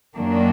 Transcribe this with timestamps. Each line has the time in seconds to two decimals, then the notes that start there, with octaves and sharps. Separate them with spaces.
0.16 F#2 D#3 F#3 A#3 D4